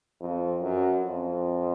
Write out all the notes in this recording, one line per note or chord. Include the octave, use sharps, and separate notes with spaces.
F2
F#2
F2